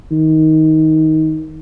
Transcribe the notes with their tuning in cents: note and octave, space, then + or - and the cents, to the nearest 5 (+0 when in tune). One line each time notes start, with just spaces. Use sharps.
D#3 +15